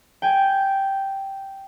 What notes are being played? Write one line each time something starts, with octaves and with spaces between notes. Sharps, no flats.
G5 G#5